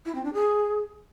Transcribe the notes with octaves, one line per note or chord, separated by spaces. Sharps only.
E4
C4
D4
G#4